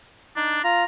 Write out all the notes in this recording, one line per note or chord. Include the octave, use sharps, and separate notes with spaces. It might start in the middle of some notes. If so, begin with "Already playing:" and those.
D4 D#4
F4 A#5